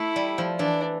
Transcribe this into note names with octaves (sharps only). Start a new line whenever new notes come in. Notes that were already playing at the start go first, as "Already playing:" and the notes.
Already playing: A3 E4
G3
F3
E3 D4